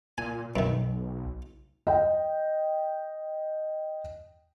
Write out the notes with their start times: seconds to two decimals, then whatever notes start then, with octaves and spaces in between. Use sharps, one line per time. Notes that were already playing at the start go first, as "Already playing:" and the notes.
0.18 A#2 G#5
0.56 B1 F#2 D#3
1.87 D#5 G5